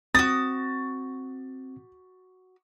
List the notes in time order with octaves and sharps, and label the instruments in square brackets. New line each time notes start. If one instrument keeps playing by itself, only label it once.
[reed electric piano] C4 [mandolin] F#4 D#6 [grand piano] A6